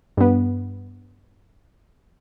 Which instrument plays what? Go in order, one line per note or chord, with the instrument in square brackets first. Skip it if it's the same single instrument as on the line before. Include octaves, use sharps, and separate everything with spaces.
[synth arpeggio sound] G2 B3